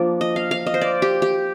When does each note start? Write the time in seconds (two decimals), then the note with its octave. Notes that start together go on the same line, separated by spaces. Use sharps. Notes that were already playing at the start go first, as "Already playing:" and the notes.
Already playing: F3 A#3 D4 D5
0.21 D#5
0.36 F5
0.51 F5
0.67 D#5
0.74 C5
0.81 D5
1.02 G4
1.22 G4